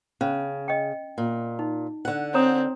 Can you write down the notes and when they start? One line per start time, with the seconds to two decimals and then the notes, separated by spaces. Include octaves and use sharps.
0.21 C#3 C#4
0.68 D#5 G5
1.18 A#2
1.59 D#4
2.05 D3 F#5
2.34 C4 C#5 A#5 D#6